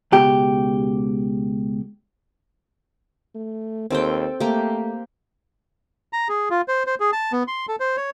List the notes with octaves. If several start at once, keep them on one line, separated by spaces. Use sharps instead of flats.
C#2 B2 G4
A3
D#2 C4 A4 G5
A3 A#3 G4
A#5
G#4
F4
C5
C5
G#4
A5
B3
C6
A4
C5
C#5